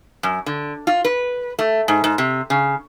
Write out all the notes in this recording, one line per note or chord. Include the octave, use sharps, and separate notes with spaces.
F#2
D3
F4
B4
A3
G#2
G#2
C3
C#3